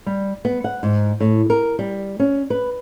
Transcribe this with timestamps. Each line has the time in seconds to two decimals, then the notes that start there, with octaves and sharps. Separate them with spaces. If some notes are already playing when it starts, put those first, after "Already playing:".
0.06 G3
0.45 B3
0.64 F#5
0.83 G#2
1.20 A2
1.50 A#4
1.79 G3
2.19 C#4
2.50 B4